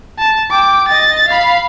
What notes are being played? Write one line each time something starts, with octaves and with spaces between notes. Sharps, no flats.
A5
G5 D6
D#5 A6
F5 B5